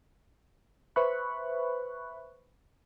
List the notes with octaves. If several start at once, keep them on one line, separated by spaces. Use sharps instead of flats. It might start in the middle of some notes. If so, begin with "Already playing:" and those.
B4 C5 E5 B5 C#6 F#6